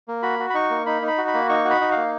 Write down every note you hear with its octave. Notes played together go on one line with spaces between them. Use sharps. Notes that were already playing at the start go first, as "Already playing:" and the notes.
A#3
F#4 B5
F#4
B5
D#4 C#6
A#3
D#4 B5
D#4
B5
F#4
B5
A#3
D#4 C#6
F#4
B5
D#4
A#3 F5